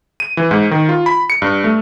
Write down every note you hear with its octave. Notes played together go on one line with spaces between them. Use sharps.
D#7
E3
G#2
D#3
F4
B5
C#7
G2
A3